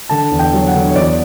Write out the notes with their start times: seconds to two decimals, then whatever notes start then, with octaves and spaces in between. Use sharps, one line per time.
0.09 D3 A5
0.31 E2
0.39 G5
0.53 F#3
0.67 F#5
0.75 D3
0.88 C#5
0.95 E2 D5